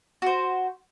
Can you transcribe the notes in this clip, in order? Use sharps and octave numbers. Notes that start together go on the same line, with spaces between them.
F#4 C5